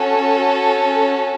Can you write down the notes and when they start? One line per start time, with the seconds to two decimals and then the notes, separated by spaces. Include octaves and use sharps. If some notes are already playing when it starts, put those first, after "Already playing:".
Already playing: C#4 F#4 A4